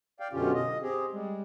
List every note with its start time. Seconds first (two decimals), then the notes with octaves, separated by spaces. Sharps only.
0.20 D5 F5 G5
0.33 F#2 B2 D3 C#4 F4 G4
0.54 D#5
0.82 C4 G4 G#4
1.12 G3 G#3